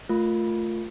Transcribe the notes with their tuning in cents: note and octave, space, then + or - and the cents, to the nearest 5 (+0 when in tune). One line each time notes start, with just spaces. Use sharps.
A3 +0 F4 +0 A#4 +0